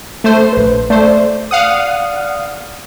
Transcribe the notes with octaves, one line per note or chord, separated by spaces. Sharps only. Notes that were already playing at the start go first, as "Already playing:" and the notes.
A3 C5
A#1 B4
A3 C5 D5
F5 F#5 D#6